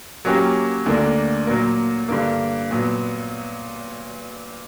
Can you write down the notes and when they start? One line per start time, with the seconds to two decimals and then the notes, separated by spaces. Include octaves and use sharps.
0.25 F#3 A#3 C#4 G4
0.86 D2 D3 A#3 D4
1.47 A#2 F#3 A#3
2.08 G2 D3 A#3
2.71 A#2 F#3 B3